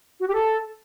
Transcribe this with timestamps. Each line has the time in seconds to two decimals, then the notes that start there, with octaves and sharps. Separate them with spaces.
0.20 F#4
0.27 G4
0.34 A4